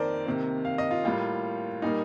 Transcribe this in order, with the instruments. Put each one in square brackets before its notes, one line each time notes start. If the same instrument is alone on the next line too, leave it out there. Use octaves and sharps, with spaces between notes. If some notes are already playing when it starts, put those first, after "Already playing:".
Already playing: [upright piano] F2 D#3 A#3 A#4 C5 D5
C3 D#3 A#3
F5
D#5
F4
A2 G3 A#3 F4
A#2 G3 A#3 D#4